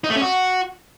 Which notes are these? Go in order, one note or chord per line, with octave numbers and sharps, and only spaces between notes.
D#4
A3
C#4
F#4